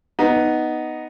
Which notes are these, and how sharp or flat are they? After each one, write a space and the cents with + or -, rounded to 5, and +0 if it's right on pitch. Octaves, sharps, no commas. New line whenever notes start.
B3 +0 D#4 +0